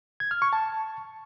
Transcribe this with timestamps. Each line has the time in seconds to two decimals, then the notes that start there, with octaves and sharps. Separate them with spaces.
0.20 G#6
0.31 F6
0.42 C#6
0.53 A5